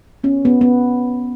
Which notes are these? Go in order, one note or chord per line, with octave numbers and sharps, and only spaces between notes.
B3 C#4
B3
B3